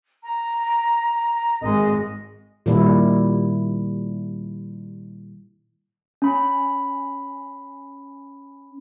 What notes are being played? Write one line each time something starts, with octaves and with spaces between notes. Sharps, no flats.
A#5
G#1 G#3 D#5
A#2 D#3 G3 E4
C#4 B5